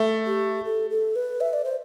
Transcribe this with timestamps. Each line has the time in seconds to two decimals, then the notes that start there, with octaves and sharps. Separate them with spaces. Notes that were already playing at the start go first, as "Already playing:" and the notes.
Already playing: A3
0.27 G4
0.65 A4
0.90 A4
1.16 B4
1.41 E5
1.53 D5
1.65 C5